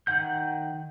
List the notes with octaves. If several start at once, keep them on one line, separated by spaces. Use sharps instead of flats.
D#3 F#5 G6